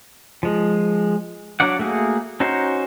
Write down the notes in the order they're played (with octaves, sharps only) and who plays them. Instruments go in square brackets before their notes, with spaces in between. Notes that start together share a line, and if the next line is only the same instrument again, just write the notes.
[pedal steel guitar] F3 G#3
F#3 D4 D5 F#5
A3 A#3 F#4 G#4
C#4 D#4 F#4 C5